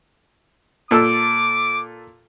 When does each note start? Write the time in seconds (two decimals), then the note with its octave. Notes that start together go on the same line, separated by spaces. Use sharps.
0.91 A#2 A4 D6 E6